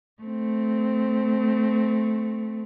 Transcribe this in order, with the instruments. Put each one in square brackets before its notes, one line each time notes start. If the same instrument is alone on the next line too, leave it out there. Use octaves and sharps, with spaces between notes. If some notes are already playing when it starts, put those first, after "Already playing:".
[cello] A3 C4